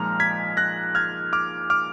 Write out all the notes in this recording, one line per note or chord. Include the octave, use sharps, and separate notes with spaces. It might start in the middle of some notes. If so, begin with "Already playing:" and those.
Already playing: A#2 F3 G#3 D#4 A#5 F6
G#6 B6
F#6 A#6
F6 G#6
D6 F6
D6 F6